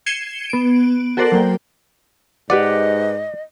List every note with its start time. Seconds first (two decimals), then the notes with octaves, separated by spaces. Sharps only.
0.06 G#6 C7 C#7 D#7 E7 G7
0.50 B3 D7
1.17 F#4 A4 A#4 C5 D5 F#5
1.32 F#3 A#3 G5
2.50 G#2 G4 B4 D5 D#5 F#5